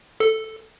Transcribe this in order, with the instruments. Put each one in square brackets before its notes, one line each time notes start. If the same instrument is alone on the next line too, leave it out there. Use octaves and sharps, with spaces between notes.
[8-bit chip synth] A4